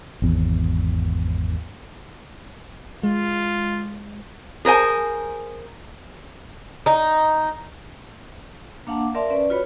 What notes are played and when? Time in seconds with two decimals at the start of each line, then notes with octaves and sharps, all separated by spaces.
0.22 G#1 E2
3.03 G#3 F4
4.65 G#4 A#4 C5 G#5
6.86 D#4
8.87 A#3 D4 F5 F#5 A5 D6
8.98 F5
9.15 A#4 D5 E5 F5 A5 C6
9.30 C#4 B4 D5
9.50 F4 F#4 B4 C#5 B5